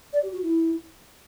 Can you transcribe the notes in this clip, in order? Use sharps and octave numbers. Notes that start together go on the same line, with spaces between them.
D5
G4
F#4
E4